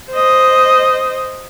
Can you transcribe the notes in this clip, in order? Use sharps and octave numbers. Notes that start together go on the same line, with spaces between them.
C5 D#5